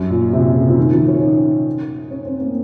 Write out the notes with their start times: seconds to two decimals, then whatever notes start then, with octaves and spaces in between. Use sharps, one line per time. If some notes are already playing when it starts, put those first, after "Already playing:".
Already playing: F#2
0.10 A#2
0.33 C3
0.55 C#3
0.70 F3
0.77 D#3
0.92 F3
1.08 C#4
1.22 D#4
2.10 C#4
2.25 C4
2.40 A#3